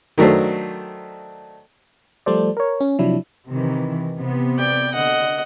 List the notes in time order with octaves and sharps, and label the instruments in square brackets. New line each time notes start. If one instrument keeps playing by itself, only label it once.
[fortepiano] D#3 F#3 A3 D4 C5
[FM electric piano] F3 G3 A3 A4 C5 D5
A#4 C#5
C#4
C3 F3 F#3 D4 E4
[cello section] C3 D#3 E3
C3 B3
[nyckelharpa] D5 G5
[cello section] D3 [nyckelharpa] D#5 F#5